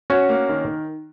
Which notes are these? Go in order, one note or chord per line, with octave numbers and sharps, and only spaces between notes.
C#4 F#4
A#3
D#3